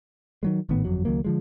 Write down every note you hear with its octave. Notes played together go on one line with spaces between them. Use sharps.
D#3 F#3 G#3
G#1 A2 D#3 B3
G1 F2 F#3
C#2 D#3 F#3 A#3
D3 F3 G#3